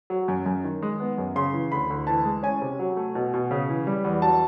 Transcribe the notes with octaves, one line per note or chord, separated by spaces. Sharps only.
F#3
F#2
F#2
D#3
G#3
B3
F#2
C#3 C6
E3
D2 B5
D2
E3 A5
G#3
C#4 G#5
C3
F#3
A3
B2
B2
C#3
E3
G3
E2
F#3 A5